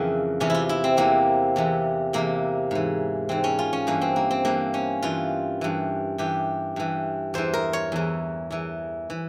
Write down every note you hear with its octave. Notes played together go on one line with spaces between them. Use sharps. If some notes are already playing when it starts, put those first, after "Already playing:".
Already playing: F2 C#3 E3 A#3
E2 C3 E3 C#4
E4 F4
E4
C4
E2 C3 E3 A#3
E2 C3 E3
E2 C3 E3 A#3
G#2 E3
G#2 E3 C4
C#4
F4
C#4
G2 E3 A#3
C4
A#3
C4
G2 E3 A#3
C#4
G2 E3 F4
G2 E3
G2 E3 G4
G2 E3
E2 E3 C5
A#4
C#5
E2 E3
E2 E3
E3